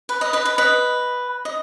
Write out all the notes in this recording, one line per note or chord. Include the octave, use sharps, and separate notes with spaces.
B4
B4 D#5
B4 D#5
B4
B4 D#5
D#5